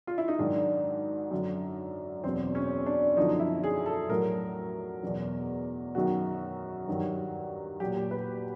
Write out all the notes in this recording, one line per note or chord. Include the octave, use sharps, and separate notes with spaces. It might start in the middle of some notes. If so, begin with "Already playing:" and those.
F4
E4
D#4
G#2 D#3 F#3 D4
F#2 D3 F#3
E2 B2 F#3 C4
C#4
D4
F#2 D3 F3 D#4
E4
G#4
A4
A2 F#3 A#4
E2 B2 F#3
F#2 D#3 F#3 F#4
G2 D#3 F#3
A#2 F#3 G4
B4